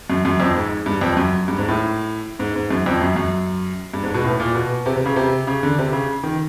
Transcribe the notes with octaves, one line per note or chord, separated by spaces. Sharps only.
F#2
F#2
F2
G#2
G2
F2
F#2
G2
G#2
A2
G#2
G#2
F#2
F2
F#2
F#2
G2
G#2
B2
A2
A#2
B2
C3
C3
C#3
C3
C#3
D3
C3
C#3
D#3